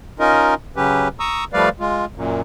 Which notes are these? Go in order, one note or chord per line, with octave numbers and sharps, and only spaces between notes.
C#4 D#4 F4 A#4 D#5
C#3 F#3 C#4 G4 B4
A#5 C#6 D#6 E6
F3 G3 A3 B4 D5 F5
G#3 F4
F#2 A#2